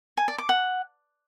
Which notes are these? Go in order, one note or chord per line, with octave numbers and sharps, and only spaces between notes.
G#5
D5
D6
F#5